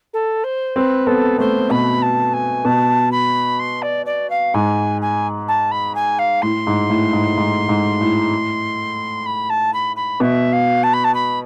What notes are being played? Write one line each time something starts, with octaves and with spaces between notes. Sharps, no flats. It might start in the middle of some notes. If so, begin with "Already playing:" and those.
A4
C5
C4 B4
B3 A4
A3 C5
B2 B5
A5
G#5
B2 A5
B5
C6
D5
D5
F5
G#2 G#5
G#5
A5
B5
G#5
F5
A2 C6
G#2
A2
G#2
G#2
G#2
A2
B5
A5
B5
B5
B2 E5
F5
A5
B5
A5
B5